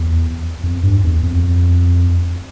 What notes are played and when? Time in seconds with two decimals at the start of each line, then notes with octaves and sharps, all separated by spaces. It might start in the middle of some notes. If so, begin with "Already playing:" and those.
Already playing: E2
0.64 F2
0.83 G2
1.03 E2
1.23 F2